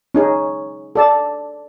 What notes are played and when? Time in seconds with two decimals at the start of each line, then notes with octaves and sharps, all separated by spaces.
0.14 C#4 D#4 G#4
0.95 A4 D5 A5